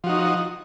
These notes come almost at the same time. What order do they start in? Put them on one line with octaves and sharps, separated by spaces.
F3 F#4 D#4